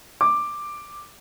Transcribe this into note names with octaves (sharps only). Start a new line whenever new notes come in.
D6